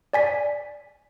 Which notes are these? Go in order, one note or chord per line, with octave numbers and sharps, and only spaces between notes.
D5 G#5 B6